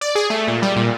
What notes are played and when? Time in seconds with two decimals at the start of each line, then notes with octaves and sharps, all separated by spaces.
0.01 D5
0.15 G#4
0.30 A3
0.48 A#2
0.62 G3
0.76 A#2